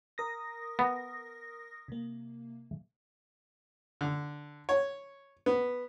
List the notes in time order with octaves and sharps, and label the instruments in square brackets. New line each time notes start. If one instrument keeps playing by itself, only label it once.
[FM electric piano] A#4 D#6 A#6
[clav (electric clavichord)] B3
[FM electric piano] C3 A#3
[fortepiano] D3
C#5
B3